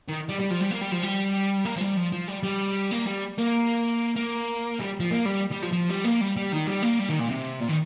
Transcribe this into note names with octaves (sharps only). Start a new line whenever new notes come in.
D#3
G3
G3
F3
G3
A#3
G3
F3
G3
A#3
F3
G3
F3
F3
G3
G3
A#3
G3
A#3
A#3
G3
F3
A#3
G3
G3
F3
F3
G3
A#3
G3
G3
D#3
G3
A#3
G3
D#3
A#2
C3
A#2
D#3